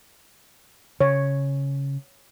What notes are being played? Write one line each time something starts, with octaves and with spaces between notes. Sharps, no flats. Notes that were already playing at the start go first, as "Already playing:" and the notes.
C#3 C#5